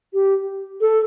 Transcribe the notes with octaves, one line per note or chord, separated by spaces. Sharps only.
G4
A4